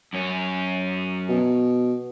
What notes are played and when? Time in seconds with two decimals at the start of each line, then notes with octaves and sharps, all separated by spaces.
0.13 F#2 C#4
1.29 B2